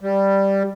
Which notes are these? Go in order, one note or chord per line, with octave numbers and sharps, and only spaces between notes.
G3